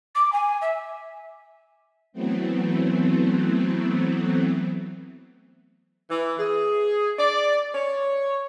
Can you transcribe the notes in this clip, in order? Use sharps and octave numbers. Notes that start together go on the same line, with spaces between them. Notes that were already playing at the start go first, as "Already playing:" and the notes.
D6
G#5
E5
E3 F#3 A3 B3 C4
E3
G#4
D5
C#5